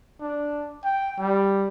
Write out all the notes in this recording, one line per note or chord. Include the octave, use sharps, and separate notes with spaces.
D4
G5
G3